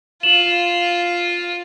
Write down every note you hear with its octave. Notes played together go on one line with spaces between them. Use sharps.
F4 E7 F#7